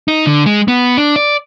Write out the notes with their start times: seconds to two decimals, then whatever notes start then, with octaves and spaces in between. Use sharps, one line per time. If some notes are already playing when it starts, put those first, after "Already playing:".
0.08 D#4
0.27 D3
0.46 G#3
0.68 B3
0.97 D4
1.16 D5